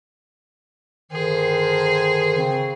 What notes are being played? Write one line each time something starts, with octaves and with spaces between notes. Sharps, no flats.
G2 D3 D#3 G#4 C5
C#3 C4